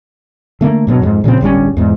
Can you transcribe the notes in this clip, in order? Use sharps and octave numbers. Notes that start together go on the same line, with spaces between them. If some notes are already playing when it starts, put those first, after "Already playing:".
D3 A3 A#3
G2 B2 F#3
F2 G#2
A#2 C#3 F3 C4
D1 G1 G3 C#4
E2 G#2